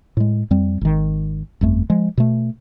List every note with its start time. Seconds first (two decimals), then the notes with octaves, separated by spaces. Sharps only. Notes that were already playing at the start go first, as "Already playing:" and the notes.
0.17 A2 G#3
0.51 F2 G3 C4
0.81 G#1 D#3
1.61 G1 F2 A3
1.90 F3 G#3
2.17 B2 A3